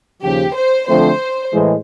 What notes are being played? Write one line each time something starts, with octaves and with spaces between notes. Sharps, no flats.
D#2 C#3 F3 G4
C5
D3 F3 A3 C4 C5
A2 E3 G#3